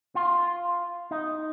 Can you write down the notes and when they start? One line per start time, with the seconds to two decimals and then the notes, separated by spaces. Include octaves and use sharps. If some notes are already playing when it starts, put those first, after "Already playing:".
0.15 F4
1.11 D#4